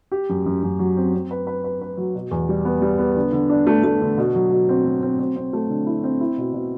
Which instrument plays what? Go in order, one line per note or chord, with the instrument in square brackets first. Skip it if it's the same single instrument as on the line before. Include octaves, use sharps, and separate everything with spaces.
[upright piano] G4
F#2
F#2
F#2
F#3
C4
C4
B4
B4
B4
B4
F#3
B2
E2
G3
B3
G3
B3
D3
D3
D4
A3
A3
D3
B2
F#3
B2
C4
F#3
C4
C4
C4
A3
D3
E4
C4
E4
B2
B2